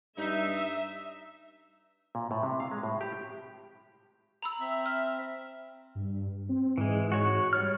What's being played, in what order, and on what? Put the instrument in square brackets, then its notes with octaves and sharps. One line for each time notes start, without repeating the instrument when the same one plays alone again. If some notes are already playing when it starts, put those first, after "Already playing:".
[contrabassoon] G2 [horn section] D#4 [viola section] E5
[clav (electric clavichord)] A#2
A2
C3
F5
G#3
A2
G4
[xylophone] A#5 B5 E6
[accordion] C4 E5
[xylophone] F6
[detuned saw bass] G2
C4
[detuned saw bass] G#2 [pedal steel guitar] E3 G#3
[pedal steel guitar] F#4 C#5 C#6
G3 C#5 F6